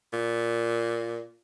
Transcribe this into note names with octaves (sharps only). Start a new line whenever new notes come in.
A#2